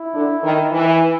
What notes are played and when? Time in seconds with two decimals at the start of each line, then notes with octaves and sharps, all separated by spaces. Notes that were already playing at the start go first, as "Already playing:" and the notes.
Already playing: E4
0.14 D3
0.43 D#3
0.72 E3